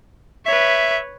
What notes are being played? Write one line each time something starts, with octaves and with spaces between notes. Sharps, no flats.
B4 C#5 E5